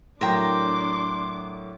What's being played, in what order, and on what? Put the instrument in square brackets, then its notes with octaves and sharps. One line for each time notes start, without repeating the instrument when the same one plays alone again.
[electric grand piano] A2 F#3 [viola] D4 D6 [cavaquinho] A#4 G5 A#5 [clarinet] C6